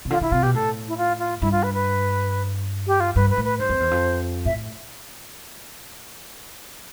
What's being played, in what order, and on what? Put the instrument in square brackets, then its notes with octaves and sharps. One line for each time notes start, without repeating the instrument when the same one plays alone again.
[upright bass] C3
[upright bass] D3 [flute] F4
[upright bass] D3 [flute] E4
[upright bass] C3 [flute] F4
[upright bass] B2 [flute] G4
[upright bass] A2 [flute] A4
[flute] E4
F4
F4
[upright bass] G2 [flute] E4
[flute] F4
B4
B4
G4
F4
[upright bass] G2 [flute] B4
[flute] B4
[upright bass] A2
[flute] B4
[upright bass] G2 [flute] C5
[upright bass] F2
E2
F2
[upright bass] A2 [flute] E5